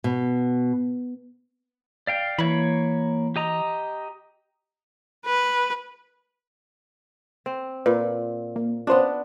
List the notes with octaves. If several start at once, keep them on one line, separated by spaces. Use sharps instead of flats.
B2
D5 F5 G5
E3 A#3 C#5 B5
G4 D#5 A#5
B4
C4
A#2 B4
A#3
B3 C#4 D4 F4 C5